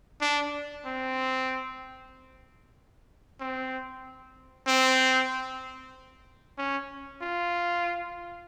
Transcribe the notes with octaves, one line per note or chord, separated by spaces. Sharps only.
D4
C4
C4
C4
C#4
F4